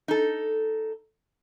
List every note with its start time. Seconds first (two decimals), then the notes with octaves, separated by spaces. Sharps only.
0.08 D#4 A4